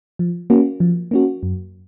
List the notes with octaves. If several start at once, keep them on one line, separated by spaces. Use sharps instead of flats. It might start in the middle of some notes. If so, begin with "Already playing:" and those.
F3
A#3 C#4 F#4
F3
A#3 C#4 F#4
F#2